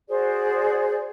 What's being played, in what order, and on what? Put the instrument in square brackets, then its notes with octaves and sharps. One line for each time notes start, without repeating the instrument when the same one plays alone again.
[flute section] F#4 G#4 C5 D5